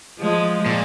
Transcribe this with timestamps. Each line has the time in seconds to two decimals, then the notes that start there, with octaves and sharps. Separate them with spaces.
0.19 F3 G#3
0.66 A#2